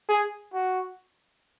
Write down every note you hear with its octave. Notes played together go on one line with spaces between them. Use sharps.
G#4
F#4